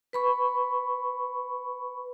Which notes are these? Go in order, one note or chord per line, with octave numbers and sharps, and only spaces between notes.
B4 B5 C#6